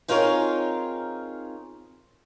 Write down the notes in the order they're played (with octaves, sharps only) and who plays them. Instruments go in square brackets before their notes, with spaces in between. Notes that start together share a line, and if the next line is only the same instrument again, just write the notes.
[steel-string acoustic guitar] C4 D#4 F4 G#4 A#4 C#5